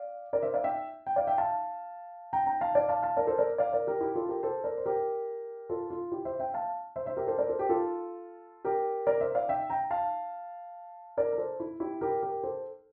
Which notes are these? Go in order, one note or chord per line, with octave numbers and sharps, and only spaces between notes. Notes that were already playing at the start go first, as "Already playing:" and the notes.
Already playing: D5 F5
A#4 D5
C5 E5
D5 F5
E5 G5
G5
D5 F5
E5 G5
F5 A5
G5 A#5
G5 A#5
F5 A5
D5 F5
F5 A5
F5 A5
A#4 D5
A4 C5
A#4 D5
D5 F5
A#4 D5
G4 A#4
E4 G4
F4 A4
G4 A#4
A4 C5
A#4 D5
C5
G4 A#4
F4 A4
F4
E4 G4
C5 E5
E5 G5
F5 A5
C5 E5
C5 E5
G4 A#4
A4 C5
A#4 D5
A4 C5
G4 A#4
F4 A4
G4 A#4
A#4 D5
C5 E5
D5 F5
E5 G5
G5 A#5
F5 A5
A#4 D5
A#4
A4 C5
E4
E4 G4
G4 A#4
G4 A#4
A4 C5